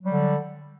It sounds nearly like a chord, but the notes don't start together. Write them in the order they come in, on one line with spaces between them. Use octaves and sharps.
F#3 G3 D3